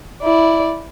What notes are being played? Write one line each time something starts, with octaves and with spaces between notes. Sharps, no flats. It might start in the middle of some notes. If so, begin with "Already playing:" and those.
E4 D5